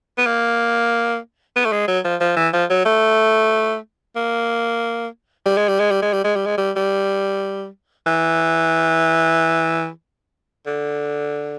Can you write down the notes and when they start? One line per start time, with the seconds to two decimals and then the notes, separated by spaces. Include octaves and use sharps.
0.18 B3
0.26 A#3
1.56 B3
1.65 A3
1.72 G#3
1.88 F#3
2.05 F3
2.21 F3
2.37 E3
2.53 F3
2.70 F#3
2.85 A3
4.16 A#3
5.46 G3
5.57 G#3
5.68 G3
5.80 G#3
5.91 G3
6.02 G#3
6.13 G3
6.24 G#3
6.36 G3
6.46 G#3
6.58 G3
6.76 G3
8.07 E3
10.67 D3